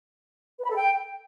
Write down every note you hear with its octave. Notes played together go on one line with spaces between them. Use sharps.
B4
B5
A4
G5